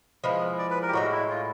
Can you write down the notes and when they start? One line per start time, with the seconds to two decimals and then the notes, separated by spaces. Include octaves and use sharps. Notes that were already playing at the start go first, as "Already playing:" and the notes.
0.24 F3 G#3 B3 E4
0.58 D5
0.71 B4
0.83 A#4
0.88 G4
0.93 A2 E3 G#3 F#4
1.12 E4
1.29 F4